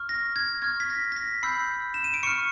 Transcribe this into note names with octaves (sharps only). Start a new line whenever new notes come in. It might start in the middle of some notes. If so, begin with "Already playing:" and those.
Already playing: C#6 F6
A#6
G#6
C#6 F6 G#6
B6
A#6
A#6
B6
B5 E6 G6 C7
E7
D#7
D7
C#6 F6 C#7